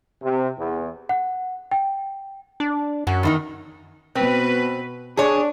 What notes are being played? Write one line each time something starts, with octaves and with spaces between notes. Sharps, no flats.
C3
E2
F#5
G5
D4
F#2 C#4 F#4
E2 D#3 D#4
B2 C4 B4
D4 G#4 C#5